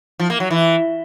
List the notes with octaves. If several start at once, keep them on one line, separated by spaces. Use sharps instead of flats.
F3
A#3
F#3
E3